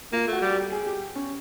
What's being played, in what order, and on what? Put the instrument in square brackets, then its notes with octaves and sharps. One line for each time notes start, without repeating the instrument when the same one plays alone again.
[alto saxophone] A#3 [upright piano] F4
[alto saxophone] A3
[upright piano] F#4
[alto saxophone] G3
[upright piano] G4
G#4
G4
C#4